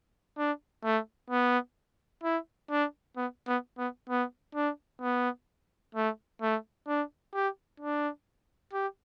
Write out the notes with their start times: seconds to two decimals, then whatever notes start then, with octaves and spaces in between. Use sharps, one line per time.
0.38 D4
0.84 A3
1.30 B3
2.23 E4
2.70 D4
3.17 B3
3.48 B3
3.78 B3
4.09 B3
4.55 D4
5.02 B3
5.95 A3
6.42 A3
6.88 D4
7.34 G4
7.81 D4
8.73 G4